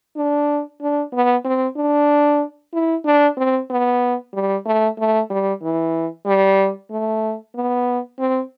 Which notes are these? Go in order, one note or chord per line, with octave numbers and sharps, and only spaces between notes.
D4
D4
B3
C4
D4
E4
D4
C4
B3
G3
A3
A3
G3
E3
G3
A3
B3
C4